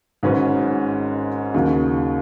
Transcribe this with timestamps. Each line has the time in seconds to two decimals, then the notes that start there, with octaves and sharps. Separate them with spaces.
0.23 G#1 G#2 F#3 C#4 B4
1.54 D#2 C#3 F#3